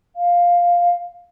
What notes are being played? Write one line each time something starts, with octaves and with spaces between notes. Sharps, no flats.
F5